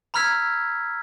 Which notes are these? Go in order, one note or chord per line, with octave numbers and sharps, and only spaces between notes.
A#5 B5 E6 F6 G#6 B6